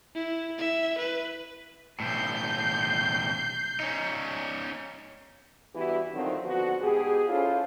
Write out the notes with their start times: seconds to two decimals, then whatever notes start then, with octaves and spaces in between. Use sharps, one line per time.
0.15 E4
0.58 E4 E5
0.98 B4
2.00 B1 A2 G6 C7
3.80 C#4 D#4
5.74 G2 E3 B3 E4 F#4 G4
6.13 D3 D#3 F3 F#3 C4
6.43 D3 F3 B3 F#4
6.80 G#2 B2 G4 G#4
7.28 C#4 E4 F4 A4 C5 C#5